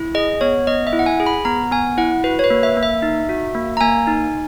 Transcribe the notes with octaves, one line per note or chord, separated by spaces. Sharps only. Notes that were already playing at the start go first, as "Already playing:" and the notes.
Already playing: E4
G#4 D#5
B3 C#5
B3 D#5
E5
E4
F#5
G#5
G#4
B5
B3 A#5
B3 G#5
E4 F#5
F#4 B4
C#5
B4
A#3
E5
A#3
E5
D#4
F#4
A#3
A#5
A#3 G#5
D#4